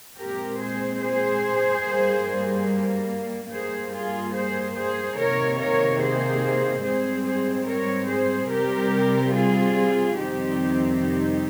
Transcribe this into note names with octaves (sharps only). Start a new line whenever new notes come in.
A#2 G#3 C4 G4 A#4
G#4 C5
G#4 C5
G2 G3 A#3
G2 G3 A#3 G#4 C5
F4 G#4
G#4 C5
G#4 C5
C3 D#3 A#3 A#4 C#5
A#4 C#5
G#4 C5
G#2 G3 C4 G#4 C5
G#4 C5
A#4 C#5
G#4 C5
C3 G3 C4 G4 A#4
F4 G#4
F2 C3 D#3 G3 C4 D#4 G4
D#4 G4